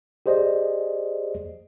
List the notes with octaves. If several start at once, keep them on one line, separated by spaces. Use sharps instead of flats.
G4 G#4 C5 D5 D#5